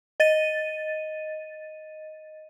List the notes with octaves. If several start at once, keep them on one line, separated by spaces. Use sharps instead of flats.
D#5 A6 D#7